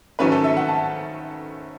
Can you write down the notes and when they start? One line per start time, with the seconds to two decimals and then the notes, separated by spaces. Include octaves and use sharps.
0.19 G#2 D#3 F#3 A3 C#4 B4
0.32 A4
0.44 E5
0.57 F#5
0.68 A5